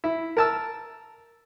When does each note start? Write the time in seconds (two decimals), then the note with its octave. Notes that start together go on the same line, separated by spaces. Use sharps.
0.04 E4
0.37 A#4 A5 E6